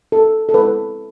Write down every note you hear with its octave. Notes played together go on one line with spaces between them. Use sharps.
A4
A4
G#3 C4 E4 B4